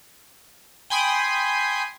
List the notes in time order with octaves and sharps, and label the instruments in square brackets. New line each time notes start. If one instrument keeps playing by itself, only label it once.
[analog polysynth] G5 G#5 B5 C6 D#6